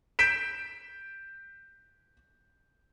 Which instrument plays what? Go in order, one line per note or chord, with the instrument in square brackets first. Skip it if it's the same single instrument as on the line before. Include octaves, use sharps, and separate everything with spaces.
[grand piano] G6 B6 D7 E7